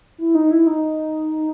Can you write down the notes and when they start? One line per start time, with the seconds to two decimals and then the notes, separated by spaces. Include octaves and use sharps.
0.18 E4
0.34 D#4
0.51 E4
0.66 D#4